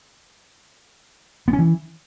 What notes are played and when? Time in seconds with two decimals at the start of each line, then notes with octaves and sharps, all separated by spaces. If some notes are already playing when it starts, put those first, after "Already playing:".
1.48 B3
1.53 C#4
1.59 E3